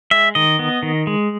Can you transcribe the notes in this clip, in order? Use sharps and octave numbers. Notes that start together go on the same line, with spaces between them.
G#3 E5
D#3 D#5
B3
D#3
G#3